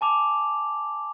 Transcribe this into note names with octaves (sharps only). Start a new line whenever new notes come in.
G#5 A5 D6 F7